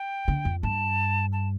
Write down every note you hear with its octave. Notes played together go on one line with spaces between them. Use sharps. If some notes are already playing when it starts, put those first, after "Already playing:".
Already playing: G5
D3
F2
G2 A5
A5